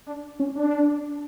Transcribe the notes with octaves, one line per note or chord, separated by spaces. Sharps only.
D4
C#4
D4